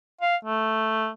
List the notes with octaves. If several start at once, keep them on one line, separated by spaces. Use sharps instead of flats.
F5
A3